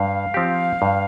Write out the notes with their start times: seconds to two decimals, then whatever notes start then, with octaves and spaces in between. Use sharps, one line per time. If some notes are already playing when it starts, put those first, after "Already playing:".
Already playing: G2 F5
0.34 F3 C4 G4
0.82 G2